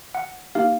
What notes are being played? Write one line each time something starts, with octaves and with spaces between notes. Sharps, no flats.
F#5
A#3 D#4 G4 F5